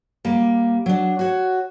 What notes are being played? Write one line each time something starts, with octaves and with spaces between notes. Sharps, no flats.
G3 A#3
F#3 D4
F#4 C#5